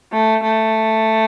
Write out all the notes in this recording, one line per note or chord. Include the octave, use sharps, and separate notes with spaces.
A3
A3